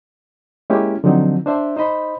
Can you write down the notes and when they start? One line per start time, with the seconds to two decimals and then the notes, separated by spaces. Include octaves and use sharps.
0.70 G#3 A#3 C#4 E4 G4
1.04 D3 F3 F#3 C4 D#4
1.46 D4 C5 E5
1.76 D#4 C5 D#5 B5